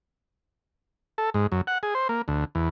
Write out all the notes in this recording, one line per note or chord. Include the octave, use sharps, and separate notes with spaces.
A4
G#2
F#2
F#5
G#4
C5
A#3
D2
E2